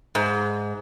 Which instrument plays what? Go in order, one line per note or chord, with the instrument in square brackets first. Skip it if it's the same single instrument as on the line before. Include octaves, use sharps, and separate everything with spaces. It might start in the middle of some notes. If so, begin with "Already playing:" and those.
[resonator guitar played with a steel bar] G#2